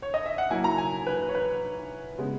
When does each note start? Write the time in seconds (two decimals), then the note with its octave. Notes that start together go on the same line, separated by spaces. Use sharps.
0.02 C#5
0.14 D#5
0.26 E5
0.38 F#5
0.50 F#3 A#3 E4 G#5
0.64 A#5
0.78 G#5
1.07 B4
1.29 C#5
1.35 B4
2.18 C#3 G#3 B3